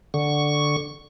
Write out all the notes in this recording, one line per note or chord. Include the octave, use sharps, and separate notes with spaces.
D3 C#6